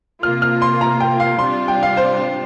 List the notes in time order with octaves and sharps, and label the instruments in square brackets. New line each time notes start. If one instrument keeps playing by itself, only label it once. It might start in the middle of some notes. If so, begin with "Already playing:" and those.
[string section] C3 A#3 F4 [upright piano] F6
[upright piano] F6
C6
A#5
G5
F5
[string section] C3 G3 D4 F4 [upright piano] C6
[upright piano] G5
F5
C5